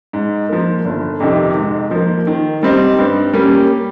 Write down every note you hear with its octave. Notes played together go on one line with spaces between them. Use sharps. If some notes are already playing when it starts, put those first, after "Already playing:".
G#2
F3 A#3
G1
F2 C3 D#3
G#2
F3 A#3
D#3
G3 C4 D#4
G2
G3 A#3 C#4